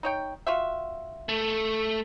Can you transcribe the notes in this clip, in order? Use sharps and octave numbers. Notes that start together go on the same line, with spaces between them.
D#4 C#5 G5
F4 F#4 E5
A3